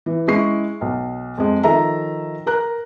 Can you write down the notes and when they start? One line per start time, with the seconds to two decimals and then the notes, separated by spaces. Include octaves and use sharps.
0.06 E3
0.28 G#3 C#4 E4 C#6 C7
0.81 B1
1.38 F2 G#3
1.63 D#3 F3 A4 E5 A#5
2.46 A#4 A#5 F#6